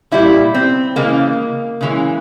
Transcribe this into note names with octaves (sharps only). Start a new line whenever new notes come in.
A#2 G3 E4
C4
C#3 E3 G#3 A#3
C#3 E3 G#3